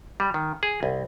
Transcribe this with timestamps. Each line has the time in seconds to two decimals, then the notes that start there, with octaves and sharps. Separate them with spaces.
0.20 G3
0.34 D#3
0.63 G#4
0.83 C2